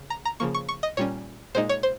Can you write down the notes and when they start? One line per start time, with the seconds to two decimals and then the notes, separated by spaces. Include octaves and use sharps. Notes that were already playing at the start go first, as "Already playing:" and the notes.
Already playing: C#3
0.10 A#5
0.25 A#5
0.40 C#3 F3 A#3 C#6
0.55 C#6
0.69 C#6
0.83 D#5
0.97 A#2 G3 C#4 C#5
1.55 A#2 G#3 D#4 C5
1.69 C#5
1.83 C5